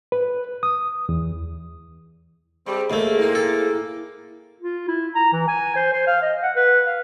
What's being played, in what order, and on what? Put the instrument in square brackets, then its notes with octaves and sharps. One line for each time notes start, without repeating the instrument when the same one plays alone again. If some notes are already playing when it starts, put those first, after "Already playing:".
[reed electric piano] B4
D#6
E2
[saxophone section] G3 C4 G4 [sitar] G#3
[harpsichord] D#2 A3 [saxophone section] A#3 [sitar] G#4 [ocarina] E5
[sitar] C4 D#4 G#4 [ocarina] E4
[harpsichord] A4
[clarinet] F4
E4
A#5
E3
G#5
C5
C5
F5
D#5
F#5
B4
F5